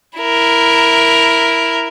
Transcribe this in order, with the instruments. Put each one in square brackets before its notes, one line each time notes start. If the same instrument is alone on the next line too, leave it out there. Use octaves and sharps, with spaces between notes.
[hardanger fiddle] E4 A#4